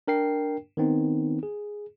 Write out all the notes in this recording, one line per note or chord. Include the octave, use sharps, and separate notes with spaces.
D4 A#4 G5 C7
D#3 B3 C4 D#4
G#4